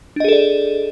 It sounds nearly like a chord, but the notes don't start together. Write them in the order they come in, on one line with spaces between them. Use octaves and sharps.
D4 D#5 G#4 A4 D5